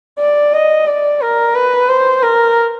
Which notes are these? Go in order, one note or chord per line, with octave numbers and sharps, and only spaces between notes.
D5
D#5
D5
A#4
B4
C5
A#4